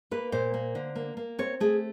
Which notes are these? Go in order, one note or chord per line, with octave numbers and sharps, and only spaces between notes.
A#3 B4
A#2 C5
A#3
D3
A#3
A#3
C4 C#5
A3 G#4